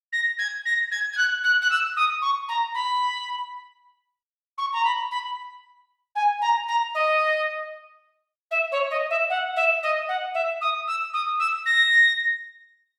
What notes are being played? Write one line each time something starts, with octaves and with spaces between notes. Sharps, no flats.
A#6
G#6
A#6
G#6
G#6
F#6
F#6
F#6
E6
D#6
C#6
A#5
B5
C#6
A#5
B5
B5
G#5
A#5
A#5
D#5
E5
C#5
D#5
E5
F#5
E5
D#5
F#5
E5
D#6
E6
D#6
E6
A#6